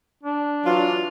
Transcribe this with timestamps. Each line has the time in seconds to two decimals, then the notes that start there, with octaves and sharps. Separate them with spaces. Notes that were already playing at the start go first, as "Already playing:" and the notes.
0.23 D4
0.66 E3 F#3 F4